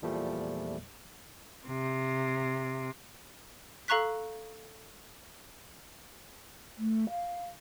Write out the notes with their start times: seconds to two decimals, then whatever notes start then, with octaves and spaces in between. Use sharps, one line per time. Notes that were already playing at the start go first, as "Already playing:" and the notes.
0.02 E2 A#2 F3 G3 A3
1.66 C3
3.88 A4 F5 A#5 C#6 F#6 B6
6.78 A3
7.09 F5